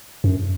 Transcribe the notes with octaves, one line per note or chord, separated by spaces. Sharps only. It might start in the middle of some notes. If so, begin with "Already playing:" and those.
F#2